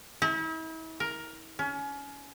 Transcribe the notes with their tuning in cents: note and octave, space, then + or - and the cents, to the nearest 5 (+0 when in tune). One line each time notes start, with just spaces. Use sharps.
E4 -40
A#4 +10
C#4 +30